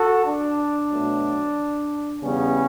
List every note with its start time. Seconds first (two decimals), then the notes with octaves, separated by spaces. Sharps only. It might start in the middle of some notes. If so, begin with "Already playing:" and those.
Already playing: F#4 A4
0.24 D4
0.89 B2 F#3 A3
2.20 E2 C#3 G3 B3 C#4